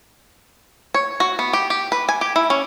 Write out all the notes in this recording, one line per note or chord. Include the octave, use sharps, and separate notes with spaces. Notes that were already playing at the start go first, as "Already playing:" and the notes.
C#5
F#4
B3
G4
G4
B4
G#5
G4
E4
C#4